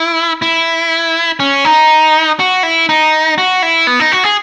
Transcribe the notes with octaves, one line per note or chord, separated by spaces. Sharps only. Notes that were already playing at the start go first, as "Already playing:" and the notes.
Already playing: E4
E4
C#4
D#4
F#4
E4
D#4
F#4
E4
B3
D#4
F#4
G#4